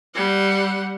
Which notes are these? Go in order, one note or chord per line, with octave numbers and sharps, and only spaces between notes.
G3 F#5